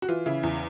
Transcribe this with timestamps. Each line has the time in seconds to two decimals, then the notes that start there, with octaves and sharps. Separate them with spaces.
0.02 F#4
0.08 E3 F4
0.26 C#3 E4
0.43 E2